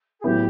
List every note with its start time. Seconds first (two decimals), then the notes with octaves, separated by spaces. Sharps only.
0.19 G#4
0.24 A2 F#3 B3 E4 G4